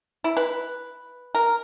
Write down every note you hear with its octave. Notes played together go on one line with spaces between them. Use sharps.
E4
B4
A#4